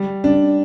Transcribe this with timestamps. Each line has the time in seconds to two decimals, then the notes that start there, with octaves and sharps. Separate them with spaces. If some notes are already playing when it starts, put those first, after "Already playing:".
Already playing: G3
0.24 D4